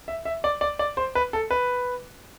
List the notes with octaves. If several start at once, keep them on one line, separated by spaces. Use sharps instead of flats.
E5
E5
D5
D5
D5
C5
B4
A4
B4